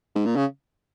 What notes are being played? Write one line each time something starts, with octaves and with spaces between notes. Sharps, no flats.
G#2
A#2
C#3